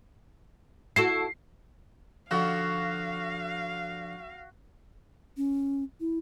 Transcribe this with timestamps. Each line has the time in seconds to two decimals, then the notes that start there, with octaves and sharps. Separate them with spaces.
0.96 E4 F#4 A4 C7
2.31 D3 F3 F#4 F5
5.37 C#4
6.00 E4